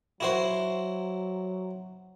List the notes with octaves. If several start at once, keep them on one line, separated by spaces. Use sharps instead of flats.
F#3 E4 F#4 C5